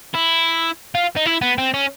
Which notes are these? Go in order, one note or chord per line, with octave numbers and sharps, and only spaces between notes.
E4
F4
D#4
E4
B3
C4
C#4